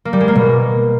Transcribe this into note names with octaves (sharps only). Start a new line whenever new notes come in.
A#3
G3
G#3
A#3
B2